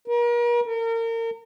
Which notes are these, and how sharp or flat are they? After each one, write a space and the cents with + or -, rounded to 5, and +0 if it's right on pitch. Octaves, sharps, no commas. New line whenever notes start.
A#4 +40
A#4 -35